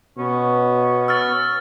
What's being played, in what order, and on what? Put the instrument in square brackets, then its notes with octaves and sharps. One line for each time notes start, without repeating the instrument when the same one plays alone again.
[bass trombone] B2 [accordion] B3 [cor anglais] C#4
[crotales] E6 F6 A6